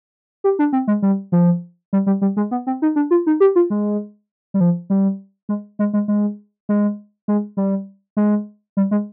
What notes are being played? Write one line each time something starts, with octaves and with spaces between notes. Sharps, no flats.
G4
D4
C4
G#3
G3
F3
G3
G3
G3
G#3
B3
C4
D#4
D4
F4
D#4
G4
F4
G#3
G3
F3
G3
G#3
G#3
G#3
G#3
G#3
G#3
G3
G#3
G3
G#3